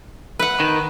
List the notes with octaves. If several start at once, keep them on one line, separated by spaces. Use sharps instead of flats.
B4 F#5
D#3